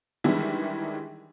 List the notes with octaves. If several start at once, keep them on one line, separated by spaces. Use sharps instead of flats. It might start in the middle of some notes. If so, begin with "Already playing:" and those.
D#3 E3 G3 G#3 D4 E4